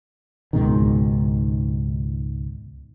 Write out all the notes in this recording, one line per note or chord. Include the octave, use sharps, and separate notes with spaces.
C#2 G#2 B2 D#3